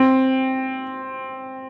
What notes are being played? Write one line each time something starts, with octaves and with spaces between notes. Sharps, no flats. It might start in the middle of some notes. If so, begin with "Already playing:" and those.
Already playing: C4